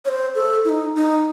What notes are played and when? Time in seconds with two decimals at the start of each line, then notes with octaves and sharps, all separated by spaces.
0.05 C#5
0.08 C5
0.35 A4
0.65 E4
0.69 D#4
0.96 D#4